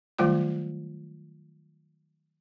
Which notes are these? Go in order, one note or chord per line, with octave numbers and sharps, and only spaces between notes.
D#3 F#3 G3 A3 F4 D6